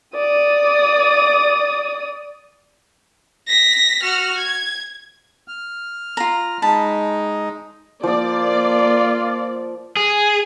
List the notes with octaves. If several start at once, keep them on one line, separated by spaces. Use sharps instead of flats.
D5 D#6
A#6 B6
F#4 F6
G#6
F6
F4 A#5
G#3 D#4 A5 B5
F3 A#3 F4 D5 D#6
G#4